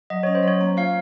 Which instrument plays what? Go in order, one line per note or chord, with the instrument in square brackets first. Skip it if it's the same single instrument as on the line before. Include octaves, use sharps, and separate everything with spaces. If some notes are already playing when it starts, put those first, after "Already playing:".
[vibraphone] F#3 [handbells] D#5
[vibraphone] C#4 [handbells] C#5
[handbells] C5
[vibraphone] F#3 [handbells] C#5
[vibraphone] A#3
[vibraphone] F4 [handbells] F5